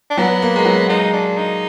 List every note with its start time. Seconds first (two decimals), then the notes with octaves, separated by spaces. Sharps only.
0.10 D4
0.17 F#3 B3
0.42 A#3
0.56 G#3
0.65 F#3
0.89 G#3 D#4
1.13 D4
1.38 D#4